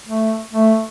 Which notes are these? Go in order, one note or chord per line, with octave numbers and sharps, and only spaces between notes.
A3
A3